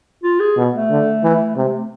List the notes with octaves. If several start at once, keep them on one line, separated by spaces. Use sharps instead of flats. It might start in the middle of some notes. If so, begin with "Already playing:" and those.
F4
G#4
B2
A3
D3
E3
C3 G#3
A3